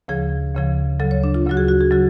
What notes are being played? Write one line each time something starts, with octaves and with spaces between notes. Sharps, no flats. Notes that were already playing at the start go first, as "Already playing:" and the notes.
D2 C#3 F3 G#4
D2 C#3 F3
D2 C#3 F#3 A4
C#5
D4
F4
D2 C#3 F#3 F#4
G#4
F#4
G#4
C#3 F#3 F#4